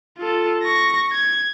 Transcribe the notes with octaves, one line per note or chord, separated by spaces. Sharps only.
F4 A4
C#6 A#6
G#6